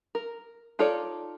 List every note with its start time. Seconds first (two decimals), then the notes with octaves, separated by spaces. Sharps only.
0.15 A#4
0.79 D#4 F4 A4 C#5 D5